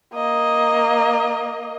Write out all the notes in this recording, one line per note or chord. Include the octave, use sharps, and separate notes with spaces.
A#3 D#5